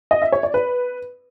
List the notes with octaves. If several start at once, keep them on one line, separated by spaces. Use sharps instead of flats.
D#5
E5
C#5
D5
B4